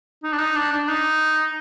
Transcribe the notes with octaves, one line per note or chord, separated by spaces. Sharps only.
D#4
D4
D#4
D4
D4
D#4